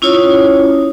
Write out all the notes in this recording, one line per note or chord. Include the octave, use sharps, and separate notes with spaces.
C#4 E4 F4 C#5 D#6